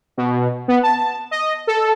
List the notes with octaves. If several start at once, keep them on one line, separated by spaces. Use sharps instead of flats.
B2
B3
A5
D#5
A4